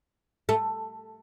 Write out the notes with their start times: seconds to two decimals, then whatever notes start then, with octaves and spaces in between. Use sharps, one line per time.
0.49 A3